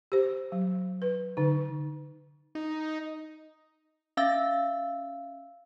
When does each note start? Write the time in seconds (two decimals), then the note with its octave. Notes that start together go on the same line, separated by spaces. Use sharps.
0.12 G4 C5
0.52 F#3
1.02 B4
1.37 D3 D#4
2.55 D#4
4.17 C#4 E5 F5 E6 A6